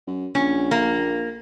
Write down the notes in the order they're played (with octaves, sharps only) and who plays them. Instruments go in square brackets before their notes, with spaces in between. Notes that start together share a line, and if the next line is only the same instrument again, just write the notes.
[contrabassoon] F#2
[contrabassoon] A#1 [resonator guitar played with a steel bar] C#4
[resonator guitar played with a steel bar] A#3